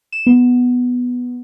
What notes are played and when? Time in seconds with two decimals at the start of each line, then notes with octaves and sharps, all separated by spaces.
0.12 E7
0.26 B3